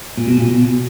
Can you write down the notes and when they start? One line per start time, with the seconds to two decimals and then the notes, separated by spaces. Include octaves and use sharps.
0.17 A#2
0.28 B2
0.38 A#2
0.48 B2